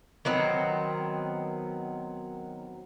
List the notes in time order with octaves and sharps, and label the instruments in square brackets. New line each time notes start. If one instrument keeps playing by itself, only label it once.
[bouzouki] D#3 F#3 B3 C4